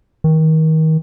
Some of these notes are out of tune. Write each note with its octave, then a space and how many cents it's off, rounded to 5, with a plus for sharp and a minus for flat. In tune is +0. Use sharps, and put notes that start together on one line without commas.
D#3 +30